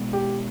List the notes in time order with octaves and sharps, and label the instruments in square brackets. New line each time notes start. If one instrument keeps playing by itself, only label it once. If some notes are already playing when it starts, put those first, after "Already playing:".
Already playing: [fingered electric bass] B2 G#3 B3
[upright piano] G4